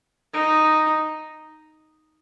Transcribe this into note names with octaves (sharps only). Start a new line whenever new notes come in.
D#4